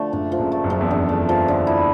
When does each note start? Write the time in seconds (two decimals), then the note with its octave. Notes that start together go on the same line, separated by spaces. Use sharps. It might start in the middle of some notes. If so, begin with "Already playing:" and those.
Already playing: D3 F3 A3
0.12 F#1 F#2 D4
0.32 F3
0.38 F#1 F#2
0.52 A3
0.64 F#1 F#2
0.70 F3
0.81 E2
0.90 F2 D4
1.09 A3
1.29 F3
1.48 D3
1.67 E4